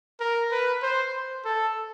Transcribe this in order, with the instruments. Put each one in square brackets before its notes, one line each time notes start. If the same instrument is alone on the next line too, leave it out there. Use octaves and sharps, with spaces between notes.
[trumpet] A#4
B4
C5
A4